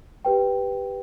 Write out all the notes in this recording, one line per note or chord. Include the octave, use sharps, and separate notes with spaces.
G4 B4 G5